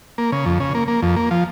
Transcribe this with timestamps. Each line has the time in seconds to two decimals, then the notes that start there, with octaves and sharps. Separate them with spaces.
0.18 A#3
0.32 C#3
0.46 F2
0.60 C#3
0.75 A#3
0.88 A#3
1.02 F2
1.16 A#3
1.31 F3